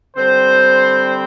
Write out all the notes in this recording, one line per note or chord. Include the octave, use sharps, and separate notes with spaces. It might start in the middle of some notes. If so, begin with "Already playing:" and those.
D3 G3 C4 C5